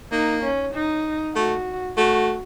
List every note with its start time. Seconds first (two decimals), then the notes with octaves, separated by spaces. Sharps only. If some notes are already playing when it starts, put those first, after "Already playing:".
0.12 A#3 D#4
0.43 C#4
0.74 D#4
1.35 A3 F#4
1.97 A3 F#4